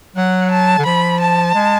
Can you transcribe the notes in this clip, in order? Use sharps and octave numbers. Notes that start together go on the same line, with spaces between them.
F#3 F#5
A5
D3
F3 B5
A5
G#3